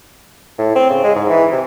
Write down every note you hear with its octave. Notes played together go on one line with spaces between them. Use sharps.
A2
C4
C#3
G#3
G#2
E3
C3